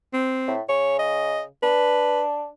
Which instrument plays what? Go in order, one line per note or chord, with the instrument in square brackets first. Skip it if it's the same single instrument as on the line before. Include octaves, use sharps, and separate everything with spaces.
[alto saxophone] C4
[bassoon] A2
[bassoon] C#3 [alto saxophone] C#5
[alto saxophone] D#5
[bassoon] D4 [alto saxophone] B4